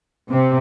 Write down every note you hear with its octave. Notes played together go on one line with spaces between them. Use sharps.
C3